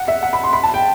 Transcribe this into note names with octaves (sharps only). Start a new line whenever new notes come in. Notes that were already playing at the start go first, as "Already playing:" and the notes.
Already playing: F#5
E5
F#5
B5
C6
B5
A5
G5